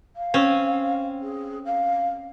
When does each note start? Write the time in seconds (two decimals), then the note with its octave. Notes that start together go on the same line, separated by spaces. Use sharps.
0.16 F5
0.34 C4 C#4
1.22 G#4
1.65 F5